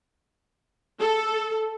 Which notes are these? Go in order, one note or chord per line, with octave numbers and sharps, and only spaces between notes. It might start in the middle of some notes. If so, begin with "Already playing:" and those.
A4